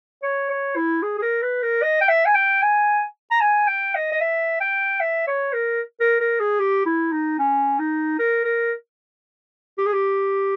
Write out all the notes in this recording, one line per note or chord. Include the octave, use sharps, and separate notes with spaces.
C#5
C#5
E4
G#4
G#4
A#4
B4
A#4
D#5
G5
E5
G#5
G5
G#5
A#5
G#5
G5
D#5
D#5
E5
G5
E5
C#5
A#4
A#4
A#4
G#4
G4
E4
D#4
C#4
D#4
A#4
A#4
G4
G#4
G4